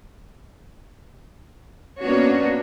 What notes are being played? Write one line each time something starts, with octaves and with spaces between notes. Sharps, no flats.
A#3 B3 C#4 D4 F#4 C#5